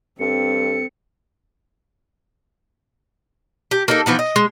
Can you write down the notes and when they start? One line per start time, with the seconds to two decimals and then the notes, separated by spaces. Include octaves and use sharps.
0.20 G2 C4 A4 C#7
3.71 G4
3.88 A#3 D#4 A4
4.06 E3 F3 B3 D#4
4.19 D#5
4.36 G#3